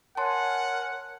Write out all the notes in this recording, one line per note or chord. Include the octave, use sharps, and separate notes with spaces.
A#4 C#5 F#5 G#5 A5 C6